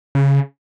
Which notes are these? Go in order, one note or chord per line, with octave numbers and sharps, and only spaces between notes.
C#3